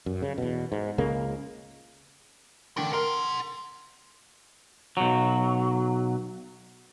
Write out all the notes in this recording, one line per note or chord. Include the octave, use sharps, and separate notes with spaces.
F#2
C#3
E2 B2
G#2
C#2 C#3 G#3 A#3
D3 A#4 G5
A#4 F#5 C6
B1 F#3